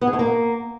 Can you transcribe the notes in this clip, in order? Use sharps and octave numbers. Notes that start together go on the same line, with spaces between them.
B3
G#4
A3
A#3